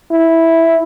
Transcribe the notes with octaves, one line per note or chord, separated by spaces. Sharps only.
E4